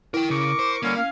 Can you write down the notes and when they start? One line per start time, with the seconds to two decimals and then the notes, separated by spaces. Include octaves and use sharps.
0.14 E4 A#4 G5
0.30 C#3 A#4 C#6 D6
0.59 C5
0.83 D3 G3 A#3 C#4
0.97 C#4 F5